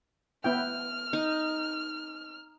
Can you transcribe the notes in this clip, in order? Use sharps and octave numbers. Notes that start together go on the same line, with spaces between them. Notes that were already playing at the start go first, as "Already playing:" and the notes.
B3 E4 G5 F6
D#4